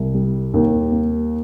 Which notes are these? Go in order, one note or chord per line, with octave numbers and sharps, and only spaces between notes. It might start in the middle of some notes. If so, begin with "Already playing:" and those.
Already playing: C2
G3
D#2
A#3